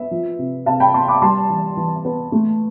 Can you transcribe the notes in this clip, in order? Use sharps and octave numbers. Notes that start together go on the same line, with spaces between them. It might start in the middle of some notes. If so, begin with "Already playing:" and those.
Already playing: B3 E5
F3
C3
C3 F5 A5
G5 B5
B3 A5 C6
B5 D6
G3 A5 C6
E3
E3
B3
A3